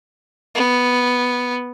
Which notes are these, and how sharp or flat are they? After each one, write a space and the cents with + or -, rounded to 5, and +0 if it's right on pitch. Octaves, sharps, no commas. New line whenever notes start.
B3 +0